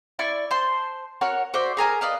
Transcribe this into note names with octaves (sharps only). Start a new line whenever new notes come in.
E4 D5 C#6
C5 A5 C6
F#4 A#4 C#5 F#5
F#4 C5 D5 E5
G#4 A#4 G#5 A#5
B4 D5 D#5 F5